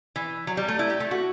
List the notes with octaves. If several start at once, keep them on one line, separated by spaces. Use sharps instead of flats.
E3
F#3
G3
A3
E4
G4
A3
F#4